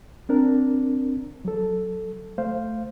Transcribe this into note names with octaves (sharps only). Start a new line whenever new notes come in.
C4 D4 A#4
F#3 A4
A3 C5 F5